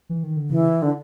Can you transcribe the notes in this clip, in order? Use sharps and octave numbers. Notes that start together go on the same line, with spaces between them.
E3
D#3
D3
C#3 E3
D3